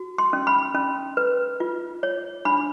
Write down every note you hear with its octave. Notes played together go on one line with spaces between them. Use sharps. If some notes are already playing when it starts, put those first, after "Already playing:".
Already playing: F#4
C6
C#4
B5
C#4
B4
F4
C#5
D4 B5